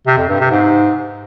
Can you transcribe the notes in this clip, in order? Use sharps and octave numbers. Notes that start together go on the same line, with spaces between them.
C3
F2
G2
C3
G#2